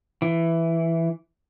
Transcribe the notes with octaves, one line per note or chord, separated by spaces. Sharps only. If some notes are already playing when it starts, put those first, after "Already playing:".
E3